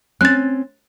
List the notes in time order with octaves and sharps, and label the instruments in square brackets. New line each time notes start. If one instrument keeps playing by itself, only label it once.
[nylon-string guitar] C4 C#4 [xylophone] F#6 A6